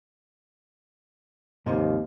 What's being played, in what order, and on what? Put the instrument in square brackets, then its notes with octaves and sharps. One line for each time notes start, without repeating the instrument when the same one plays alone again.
[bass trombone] D#2 [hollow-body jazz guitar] G#2 C3 F3